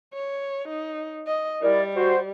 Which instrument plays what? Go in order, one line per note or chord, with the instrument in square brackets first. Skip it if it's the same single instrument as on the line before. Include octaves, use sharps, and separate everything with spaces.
[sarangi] C#5
D#4
D#5
[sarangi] G3 [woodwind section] E4 A#4 D5
[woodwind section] F#4 C5